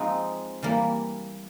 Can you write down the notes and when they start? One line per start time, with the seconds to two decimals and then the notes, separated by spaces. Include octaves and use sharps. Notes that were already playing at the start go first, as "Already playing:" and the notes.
Already playing: F3 G#3 C4 D#4
0.63 E3 G3 A#3